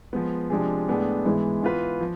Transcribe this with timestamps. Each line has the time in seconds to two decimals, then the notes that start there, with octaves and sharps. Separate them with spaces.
0.13 F3 G#3 B3
0.50 C3 F3 G#3 D4 G#4
0.88 A2 G#3 B3 D4 G#4
1.25 G#2 E3 G#3 B3 E4
1.62 E3 B3 F4 B4
2.01 F3